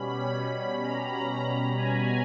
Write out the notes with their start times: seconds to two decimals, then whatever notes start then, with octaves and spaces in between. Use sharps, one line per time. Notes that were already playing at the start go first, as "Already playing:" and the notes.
Already playing: B2 G3 C#4 B5
0.35 B5
0.82 A#5
1.78 G#5